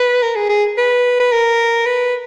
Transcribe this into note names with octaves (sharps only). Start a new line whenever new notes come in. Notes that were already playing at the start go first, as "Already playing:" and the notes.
Already playing: B4
A#4
G#4
G#4
B4
B4
A#4
B4